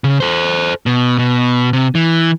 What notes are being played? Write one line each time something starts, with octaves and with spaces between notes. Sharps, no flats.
C#3
A4 C5
B2
B2
C3
E3